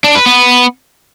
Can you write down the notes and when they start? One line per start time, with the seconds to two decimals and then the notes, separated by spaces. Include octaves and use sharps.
0.04 D4
0.15 B4
0.26 B3